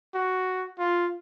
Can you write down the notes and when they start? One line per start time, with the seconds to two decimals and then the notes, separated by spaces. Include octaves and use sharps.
0.14 F#4
0.79 F4